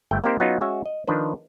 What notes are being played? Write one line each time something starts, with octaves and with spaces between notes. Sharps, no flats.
G1 A3 G5
A#3 C4 D#4 G4 A#4 C5
F#3 B3 C#4 D#4 F4 F#4
G#3 C#4 F#4 E5
D#5
D#3 F3 D4 B4 C5